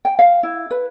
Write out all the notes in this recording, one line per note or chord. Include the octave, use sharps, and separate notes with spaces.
G5
F5
E4
B4